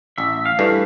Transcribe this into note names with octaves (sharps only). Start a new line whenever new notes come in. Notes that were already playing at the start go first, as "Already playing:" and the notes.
A1 E5
F5
G2 E3 A3